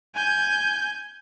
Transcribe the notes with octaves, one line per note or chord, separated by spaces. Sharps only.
G#5 G6